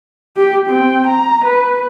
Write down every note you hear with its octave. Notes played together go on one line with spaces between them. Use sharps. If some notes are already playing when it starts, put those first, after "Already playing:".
G4
C4 G5
A#5
B4